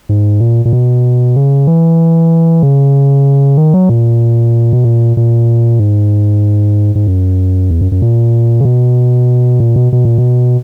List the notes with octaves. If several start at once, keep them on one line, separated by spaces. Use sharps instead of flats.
G#2
A#2
A#2
B2
C#3
E3
C#3
D#3
F#3
A#2
B2
A#2
A#2
G#2
G#2
F#2
E2
F#2
F#2
A#2
C#3
B2
A#2
B2
B2
A#2
B2